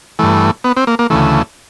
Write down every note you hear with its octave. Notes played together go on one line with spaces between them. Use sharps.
G2 E3 A3
B3
C4
A#3
A#3
D2 C#3 E3 A3